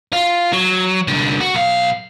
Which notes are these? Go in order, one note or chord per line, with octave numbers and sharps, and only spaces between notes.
F4
F#3
C2 D3
F#4
B1 F5